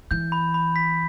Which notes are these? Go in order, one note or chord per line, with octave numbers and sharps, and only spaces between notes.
E3 G6
B5
B5
B6